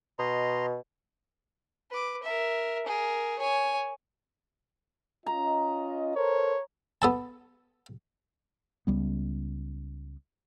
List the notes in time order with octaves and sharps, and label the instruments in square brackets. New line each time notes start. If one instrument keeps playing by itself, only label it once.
[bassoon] B2 [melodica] D#5 A#5 C6
[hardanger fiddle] B4 D6
A#4 E5
G#4 A#4
C#5 G#5
[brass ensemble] C#4 F4 D#5 [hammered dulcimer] A#5
[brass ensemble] A4 A#4 C5 [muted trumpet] C#5
[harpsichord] B3 A4 A5
[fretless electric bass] C#2 G3 B3